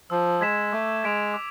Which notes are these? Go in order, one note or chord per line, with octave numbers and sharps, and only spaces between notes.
F3 E6
G#3 G#6 B6 E7
A3 D6
G#3 G#6 B6 D7 F7
D6